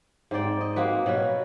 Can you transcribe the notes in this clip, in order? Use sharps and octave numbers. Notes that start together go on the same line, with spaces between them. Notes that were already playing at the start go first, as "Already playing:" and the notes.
G#2 C4 D5 G5
D#5
A#3 C4 F#4 B4
B2 F#3 F#4 B4